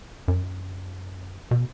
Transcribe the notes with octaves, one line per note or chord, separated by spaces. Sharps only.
F#2
B2